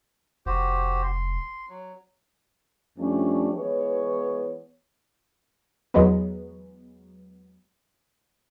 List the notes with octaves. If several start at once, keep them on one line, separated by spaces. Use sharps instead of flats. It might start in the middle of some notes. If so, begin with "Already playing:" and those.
F1 F#4 G4 C5
C6
F#3
F2 F3 G3 A3 C#4 D4
E3 G#3 B3 C#5
E2 F#3 G#3 B3